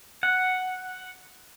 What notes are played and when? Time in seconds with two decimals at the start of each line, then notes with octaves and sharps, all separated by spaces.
0.23 F#5